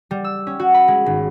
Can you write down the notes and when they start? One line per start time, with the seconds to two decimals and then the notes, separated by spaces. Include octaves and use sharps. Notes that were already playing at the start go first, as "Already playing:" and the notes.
0.11 G3
0.24 E6
0.47 C#4
0.60 F#4
0.74 B5
0.88 G#3
1.06 G#1